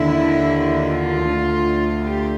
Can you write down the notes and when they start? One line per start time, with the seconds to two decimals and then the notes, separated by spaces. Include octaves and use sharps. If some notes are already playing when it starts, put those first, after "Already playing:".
Already playing: D#2 D3 E4
0.86 F4
1.26 D2 D3
2.06 G4